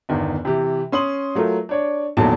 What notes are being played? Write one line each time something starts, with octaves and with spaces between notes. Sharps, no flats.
G1 E2 D#3
C3 E3 G4
C#4 C6 D#6 F#7
F#3 A3 F4 A#4
D4 C#5 D5
A#1 E2 D#3 F#3 A3 A5